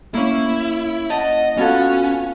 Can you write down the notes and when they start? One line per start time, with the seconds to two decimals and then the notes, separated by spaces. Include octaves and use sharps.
0.14 A#3 C#4 E4
1.10 D#5 F#5 A5
1.57 B3 C#4 F4 F#4 A4